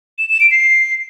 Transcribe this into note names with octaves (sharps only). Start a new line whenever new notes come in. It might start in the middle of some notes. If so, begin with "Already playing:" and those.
E7
E7
D7
C7